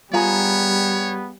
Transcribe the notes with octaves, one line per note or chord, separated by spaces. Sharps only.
G3 B3 F4 G#4 C#5 A#5